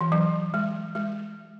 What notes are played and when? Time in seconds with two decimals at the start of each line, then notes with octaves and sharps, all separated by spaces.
0.01 E3
0.12 F#3
0.54 G#3
0.95 G#3